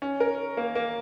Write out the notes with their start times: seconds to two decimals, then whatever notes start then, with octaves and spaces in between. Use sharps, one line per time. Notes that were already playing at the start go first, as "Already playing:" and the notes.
0.02 C#4
0.20 A#4
0.57 A#3
0.75 A#3